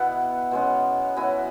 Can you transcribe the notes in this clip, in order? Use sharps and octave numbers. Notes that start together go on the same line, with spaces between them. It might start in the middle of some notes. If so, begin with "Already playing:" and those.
Already playing: B2 B3 E4 F#5
B2 G#3 C#4
F#3 B3 E4 G#5